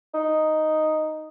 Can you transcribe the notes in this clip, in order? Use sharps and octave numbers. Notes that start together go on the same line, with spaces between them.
D#4